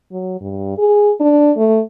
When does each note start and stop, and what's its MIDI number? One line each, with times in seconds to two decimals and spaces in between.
0.11 0.37 54
0.41 0.76 43
0.78 1.12 68
1.20 1.52 62
1.57 1.80 57